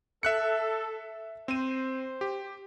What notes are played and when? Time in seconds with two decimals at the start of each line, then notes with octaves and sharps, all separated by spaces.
0.23 A4 E5 F#6 C#7
1.48 C4 C5 D#7
2.21 G4